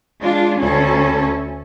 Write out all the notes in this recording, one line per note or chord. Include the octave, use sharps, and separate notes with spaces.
G#3 D4 F4
D2 C#4 A4